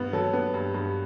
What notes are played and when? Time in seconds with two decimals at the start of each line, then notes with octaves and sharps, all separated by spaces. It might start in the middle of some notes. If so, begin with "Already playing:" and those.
Already playing: G2 B3
0.13 F#3 A4
0.33 B3
0.54 G2
0.74 G2